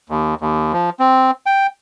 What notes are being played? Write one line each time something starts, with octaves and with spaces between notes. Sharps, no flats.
D#2
D#2
F3
C4
G5